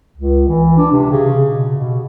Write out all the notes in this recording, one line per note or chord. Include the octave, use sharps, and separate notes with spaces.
C#2
E3
D4
C3
C#3
B2
B2